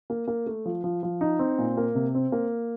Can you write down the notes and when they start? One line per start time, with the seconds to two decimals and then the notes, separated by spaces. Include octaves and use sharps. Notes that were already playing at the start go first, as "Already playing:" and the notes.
0.10 A#3
0.28 A#3
0.47 A3
0.65 F3
0.84 F3
1.03 F3
1.21 D#4
1.39 C4
1.58 A#2
1.77 A#3
1.95 C3
2.15 C4
2.32 A#3